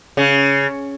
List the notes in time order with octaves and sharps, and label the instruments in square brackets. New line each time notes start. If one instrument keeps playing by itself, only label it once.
[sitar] C#3